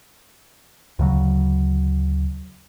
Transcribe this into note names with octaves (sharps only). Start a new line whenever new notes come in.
D2 C#3 F#3